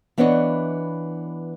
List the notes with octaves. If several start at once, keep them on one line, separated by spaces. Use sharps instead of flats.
E3 B3 D4 B4 C#5 D#5